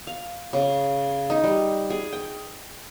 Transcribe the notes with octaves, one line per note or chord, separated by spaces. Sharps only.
F5
C#3
D#4
G3
G#4
G5